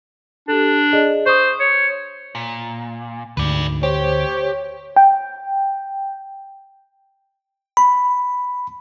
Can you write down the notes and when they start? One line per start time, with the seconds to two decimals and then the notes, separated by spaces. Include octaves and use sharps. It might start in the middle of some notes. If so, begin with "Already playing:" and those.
0.48 D4 G4 A4
0.93 G#4 D5 D#5
1.26 C5 C#6 D#6
1.60 C#5
2.35 A#2
3.37 D2 G#2 B4 D5
3.83 G4 C5 C#5
4.96 G5
7.77 B5